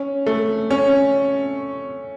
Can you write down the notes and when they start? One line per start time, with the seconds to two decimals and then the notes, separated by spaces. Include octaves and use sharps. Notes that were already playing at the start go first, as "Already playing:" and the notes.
Already playing: C#4
0.26 A3
0.71 C#4